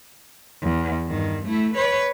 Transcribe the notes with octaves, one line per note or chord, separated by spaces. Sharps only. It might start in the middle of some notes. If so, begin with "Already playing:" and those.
E2
G2 D#3
A3 E4
B4 C#5